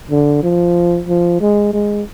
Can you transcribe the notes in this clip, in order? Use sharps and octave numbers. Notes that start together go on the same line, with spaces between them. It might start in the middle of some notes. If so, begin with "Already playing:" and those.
D3
F3
F3
G#3
G#3